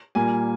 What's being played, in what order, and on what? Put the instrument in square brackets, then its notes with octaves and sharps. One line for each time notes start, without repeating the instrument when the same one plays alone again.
[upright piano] A#2 G3 A#3 G#5